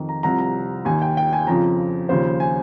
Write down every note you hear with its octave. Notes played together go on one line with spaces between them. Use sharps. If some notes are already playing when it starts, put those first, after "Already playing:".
Already playing: F2 D#3
A#5
C2 C3 F3 A#5
A#5
D#2 D#3 G#5
G5
G5
G#5
F2 C#3 F3 A#5
D#2 C#3 F3 C5
G#5